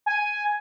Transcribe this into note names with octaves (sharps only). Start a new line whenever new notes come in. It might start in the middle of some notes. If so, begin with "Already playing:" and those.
G#5